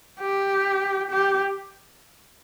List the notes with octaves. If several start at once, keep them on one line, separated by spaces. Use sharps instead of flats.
G4
G4